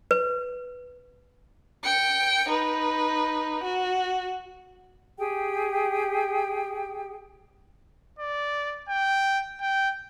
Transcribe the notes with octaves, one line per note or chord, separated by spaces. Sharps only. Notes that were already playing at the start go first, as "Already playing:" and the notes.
B4
G5 C#7
D#4 B4
F#4
G4 G#4 G5
D5
G5
G5